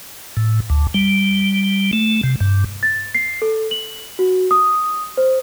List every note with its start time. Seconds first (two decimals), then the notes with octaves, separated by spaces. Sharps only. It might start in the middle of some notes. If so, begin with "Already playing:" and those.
0.37 A2
0.70 D2
0.94 G3
1.93 A3
2.23 C3
2.40 G2
2.83 A6
3.15 C7
3.42 A4
3.71 F#7
4.19 F#4
4.51 D#6
5.17 C5